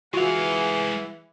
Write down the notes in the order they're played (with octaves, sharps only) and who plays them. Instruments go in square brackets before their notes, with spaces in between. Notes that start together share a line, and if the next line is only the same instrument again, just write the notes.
[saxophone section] E3 [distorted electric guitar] G#3 F5 [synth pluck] F4 F#4 [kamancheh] G#4 F#5